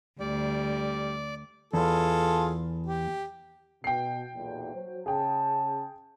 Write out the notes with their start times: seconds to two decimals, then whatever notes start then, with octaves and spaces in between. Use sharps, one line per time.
0.20 D2 G3 D5
1.73 E2 F4 G#4 A4
2.86 G4
3.84 B2 G5 C7
4.35 B1 E2 A#2
4.74 F#3 C5
5.06 C#3 G#4 G5 A5